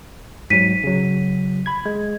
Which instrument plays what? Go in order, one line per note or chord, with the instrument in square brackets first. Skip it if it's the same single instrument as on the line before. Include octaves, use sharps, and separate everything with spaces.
[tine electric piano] G#2 F#3 [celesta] B6 D#7
[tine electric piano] C#3 F#3
B5 G#6
[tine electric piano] G#3 [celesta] G#6